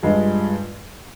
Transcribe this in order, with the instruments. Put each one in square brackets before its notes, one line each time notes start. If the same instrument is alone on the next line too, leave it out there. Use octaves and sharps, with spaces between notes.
[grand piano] G2 F3 G#3